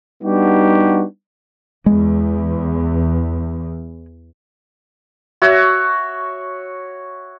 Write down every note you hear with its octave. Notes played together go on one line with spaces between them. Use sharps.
G3 B3 D4 D#4 F#4 G4
E2 G#3
F#4 C#5 E5